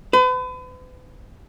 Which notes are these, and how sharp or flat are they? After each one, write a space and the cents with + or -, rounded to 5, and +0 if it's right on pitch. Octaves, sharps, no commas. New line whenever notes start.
B4 +40